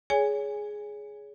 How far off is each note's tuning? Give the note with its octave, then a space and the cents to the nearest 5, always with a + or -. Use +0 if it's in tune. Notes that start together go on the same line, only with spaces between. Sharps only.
G#4 +5 C#5 +30 G#5 -15